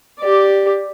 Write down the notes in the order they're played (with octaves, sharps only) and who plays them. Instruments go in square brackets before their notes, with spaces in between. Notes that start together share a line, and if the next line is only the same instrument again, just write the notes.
[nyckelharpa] G4 D5